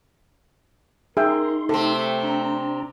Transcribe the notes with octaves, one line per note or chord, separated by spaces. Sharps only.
D#4 G#4 A#4 E5 G5 C6
C3 A3 C4 A4
D4 A#5